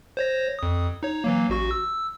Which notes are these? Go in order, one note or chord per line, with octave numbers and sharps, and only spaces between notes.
C5 C#5 A#6
F2 D#6
D#4 C#5
E3 F#3 A#3
A1 F#4 C#6
E6